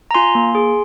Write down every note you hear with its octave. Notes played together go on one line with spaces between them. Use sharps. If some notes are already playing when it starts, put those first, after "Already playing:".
A#5
F4 G#5 C6
A#3
G#4